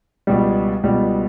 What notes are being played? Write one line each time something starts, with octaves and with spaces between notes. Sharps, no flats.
C#2 B2 G3
C#2 B2 G3